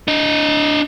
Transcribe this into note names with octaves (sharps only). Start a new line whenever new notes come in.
D4 D#5